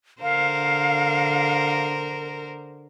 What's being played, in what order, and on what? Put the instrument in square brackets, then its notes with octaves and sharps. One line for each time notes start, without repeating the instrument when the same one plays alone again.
[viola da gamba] D3 A#4 C5 [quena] F5